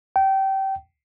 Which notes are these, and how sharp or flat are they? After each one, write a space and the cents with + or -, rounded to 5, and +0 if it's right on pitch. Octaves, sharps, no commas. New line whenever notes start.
G5 -25